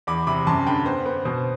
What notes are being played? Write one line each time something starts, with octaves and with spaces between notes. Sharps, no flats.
E2 B5 D6
C3 B5 D6
F#2 A5 C6
D3 G5 B5
B3 C5
B3
B2 C5